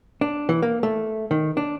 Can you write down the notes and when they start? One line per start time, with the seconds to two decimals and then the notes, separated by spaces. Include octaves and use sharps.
0.21 D4
0.49 E3
0.62 A#3
0.83 A3
1.31 D#3
1.57 D4